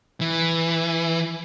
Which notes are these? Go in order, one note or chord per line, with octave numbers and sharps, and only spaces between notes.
E3